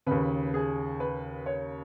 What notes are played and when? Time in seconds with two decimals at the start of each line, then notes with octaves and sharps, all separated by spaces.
0.07 D#2 C#3 B4
0.54 G#4
1.00 B4
1.46 C#5